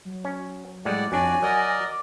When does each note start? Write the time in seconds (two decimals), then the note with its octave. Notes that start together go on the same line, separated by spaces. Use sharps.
0.05 F#3
0.25 C#4
0.85 A2 G3 G#3 D5 F#5
1.12 F2 D4 F#4 C#5 D5 G#5
1.42 F#3 A#4 D5 D#5 F#5
1.87 D6